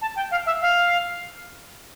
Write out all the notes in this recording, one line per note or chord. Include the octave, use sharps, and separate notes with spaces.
A5
G5
F5
E5
F5